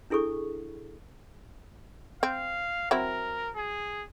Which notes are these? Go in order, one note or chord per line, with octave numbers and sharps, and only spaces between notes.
D4 E4 G#4 A4 C#6
C4 F5
F#3 C4 E4 A#4
G#4